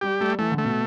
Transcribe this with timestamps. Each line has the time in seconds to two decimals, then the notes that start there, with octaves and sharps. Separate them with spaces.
0.01 G3 G4
0.20 G3 A3
0.39 E3 A3
0.52 D3
0.58 A3
0.64 B2